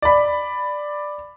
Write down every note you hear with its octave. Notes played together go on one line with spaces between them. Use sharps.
D5 B5